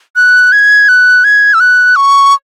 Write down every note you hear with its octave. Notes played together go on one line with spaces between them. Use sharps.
F#6
G#6
F#6
G#6
E6
F#6
C#6